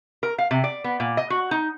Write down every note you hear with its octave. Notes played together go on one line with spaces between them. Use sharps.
A#4
F5
C3
D5
B3
A#2
D#5
F#4
D#4